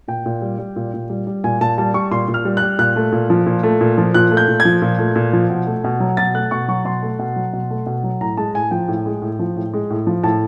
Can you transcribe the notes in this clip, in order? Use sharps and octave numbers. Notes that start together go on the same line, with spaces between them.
A#2 G5
A#2
G3
G3
A#2
A#2
G3
G3
A#2 G#5
A#2 A5
G3 A5
G3 C#6
A#2 C6
A#2
F6
G3
F#6
G3
A#2 F#6
A3
A#2
F3
A#2
A3
A#2
F3
A#2 F#6
A3
G6
A#2
G#6
F3
A#2
A3
A#2
F3
B2
A3
B2
F#3
B2 A6
A3 F#6
B2 C#6
F#3 C#6
B2 C6
A3
B2
F#3
B2
A3
B2
F#3
A2 A#5
G#3 A5
A2 G#5
F3 G5
A2
G#3
A2
F3
A2
G#3
A2
F3
A2 A5